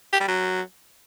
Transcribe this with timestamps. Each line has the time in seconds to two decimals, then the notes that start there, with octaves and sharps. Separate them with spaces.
0.13 G4
0.20 G3
0.28 F#3